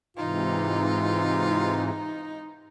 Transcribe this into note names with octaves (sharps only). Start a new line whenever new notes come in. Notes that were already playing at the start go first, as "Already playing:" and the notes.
G#2 C3 E3 D#4 F4